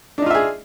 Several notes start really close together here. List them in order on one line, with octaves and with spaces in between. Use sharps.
D4 D#4 F4 E5 G#4